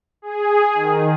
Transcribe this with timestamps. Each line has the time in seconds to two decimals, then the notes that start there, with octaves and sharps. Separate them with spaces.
0.22 G#4
0.74 D#3